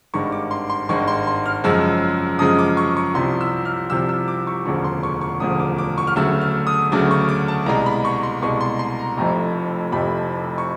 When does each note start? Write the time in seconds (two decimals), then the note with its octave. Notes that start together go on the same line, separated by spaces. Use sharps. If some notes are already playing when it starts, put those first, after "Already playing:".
0.14 G#1 G2 D#3 G#3 C#6
0.32 D6
0.51 C6
0.70 C6
0.89 G#1 G2 D#3 G#3 C#6
1.08 C6
1.27 C6
1.46 F6
1.64 F#2 C#3 F3 G#3 E6
2.39 F#2 C#3 F3 G#3 D#6
2.59 D6
2.77 C#6
2.97 C#6
3.14 C2 C3 F3 C6
3.41 E6
3.65 F6
3.90 C2 C3 F3 E6
4.09 E6
4.28 D6
4.47 C#6
4.66 E1 D2 C#3 F3 C#6
4.84 C6
5.03 C#6
5.21 C#6
5.40 E1 D2 C#3 F3 D#6
5.59 D6
5.78 D6
5.98 C#6
6.07 F6
6.16 D2 C#3 F#3 A3 E6
6.41 F6
6.67 D#6
6.92 D2 C#3 F#3 A3 D6
7.11 C#6
7.29 D6
7.48 A5
7.66 C2 B2 G#3 A#5
7.86 B5
8.05 C#6
8.23 C6
8.42 C2 B2 G#3 C#6
8.60 C6
8.79 C6
8.99 A#5
9.17 F1 F2 C3 F3 A3 A#5
9.92 F1 F2 C3 F3 A3 B5
10.58 C#6